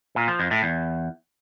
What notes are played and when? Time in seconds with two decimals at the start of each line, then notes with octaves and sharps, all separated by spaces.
0.16 A#2
0.28 F3
0.40 F2
0.51 A2
0.63 E2